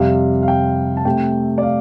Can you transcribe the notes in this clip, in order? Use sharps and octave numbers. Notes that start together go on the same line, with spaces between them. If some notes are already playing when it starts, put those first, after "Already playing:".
Already playing: F2 C3 G3 F5
F5
G5
A5
C3 A3 G5
D5
F5